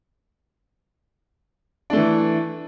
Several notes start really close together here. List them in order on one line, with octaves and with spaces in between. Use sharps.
D4 A3 E3